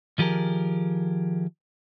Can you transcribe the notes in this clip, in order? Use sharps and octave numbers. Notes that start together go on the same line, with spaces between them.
D#3 F3 G4 G#4 A#4